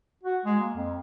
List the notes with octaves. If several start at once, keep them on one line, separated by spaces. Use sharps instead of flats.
F#4
G#3
A#3
F2